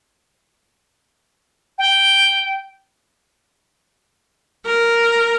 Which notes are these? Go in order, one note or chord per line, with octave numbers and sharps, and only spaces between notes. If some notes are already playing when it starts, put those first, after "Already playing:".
G5
A#4